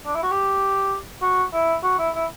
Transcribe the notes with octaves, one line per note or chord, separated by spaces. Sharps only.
D4
E4
F#4
G4
F#4
E4
F#4
E4
E4